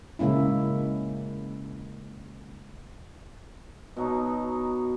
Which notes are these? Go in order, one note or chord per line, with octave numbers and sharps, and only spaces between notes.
C#3 G#3 A#3 C#4 E4
B2 F#3 D#4